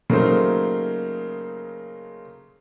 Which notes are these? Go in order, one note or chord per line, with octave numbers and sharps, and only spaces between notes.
C#3 F#3 A3 A#3 D#4 C5